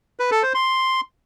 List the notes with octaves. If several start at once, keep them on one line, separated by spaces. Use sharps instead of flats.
B4
A4
C5
C6